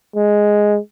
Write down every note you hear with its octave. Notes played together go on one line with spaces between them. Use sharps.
G#3